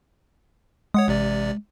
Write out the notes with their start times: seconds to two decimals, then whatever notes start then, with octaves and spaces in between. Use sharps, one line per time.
0.94 G#3 C#5 F#5 D#6
1.08 A1 C3 D5